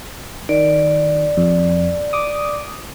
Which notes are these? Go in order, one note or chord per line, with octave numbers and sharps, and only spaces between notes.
D#3 D5
F2
D6 D#6